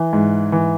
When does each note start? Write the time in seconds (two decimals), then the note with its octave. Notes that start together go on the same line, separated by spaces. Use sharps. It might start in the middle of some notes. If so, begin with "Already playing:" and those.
Already playing: E3
0.13 G#2
0.52 E3